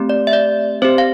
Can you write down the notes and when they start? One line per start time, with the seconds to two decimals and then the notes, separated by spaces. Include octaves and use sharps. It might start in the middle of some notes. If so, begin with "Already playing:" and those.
Already playing: A3 C4 G4
0.09 D5
0.27 E5
0.33 D5
0.82 C4 G4 C5
0.98 F5